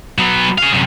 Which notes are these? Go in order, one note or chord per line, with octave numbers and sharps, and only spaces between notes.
F#3 B3
G#4 F5
F#2 C3